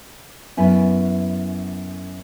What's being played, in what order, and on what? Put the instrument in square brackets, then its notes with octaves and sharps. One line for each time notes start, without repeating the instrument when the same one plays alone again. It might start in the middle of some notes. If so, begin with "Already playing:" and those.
[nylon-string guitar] F#2 B3 E4 B4 G#5